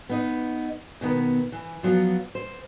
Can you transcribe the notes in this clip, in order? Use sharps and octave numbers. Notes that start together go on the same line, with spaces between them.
B3 D#4 D#5
B2 D#3 B3
E3
F3 F#3 B3 F4
C5